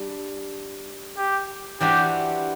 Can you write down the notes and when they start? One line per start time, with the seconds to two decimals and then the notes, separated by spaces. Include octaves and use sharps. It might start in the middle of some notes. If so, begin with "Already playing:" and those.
Already playing: G3 D4
1.17 G4
1.80 E3 G3 D4 F#4 G4 C5